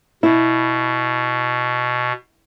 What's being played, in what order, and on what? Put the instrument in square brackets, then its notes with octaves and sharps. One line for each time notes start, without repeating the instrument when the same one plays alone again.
[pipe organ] B2 [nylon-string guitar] E4